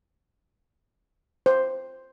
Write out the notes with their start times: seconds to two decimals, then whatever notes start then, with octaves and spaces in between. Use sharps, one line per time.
1.46 C5